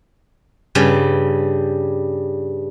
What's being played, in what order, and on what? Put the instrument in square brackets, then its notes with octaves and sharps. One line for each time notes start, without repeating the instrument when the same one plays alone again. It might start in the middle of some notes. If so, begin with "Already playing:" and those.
[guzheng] G2 C#3 G3